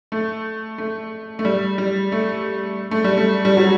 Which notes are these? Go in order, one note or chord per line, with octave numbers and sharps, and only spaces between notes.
A3
A3
A3
G3
G3
A3
A3
G3
A3
G3
F#3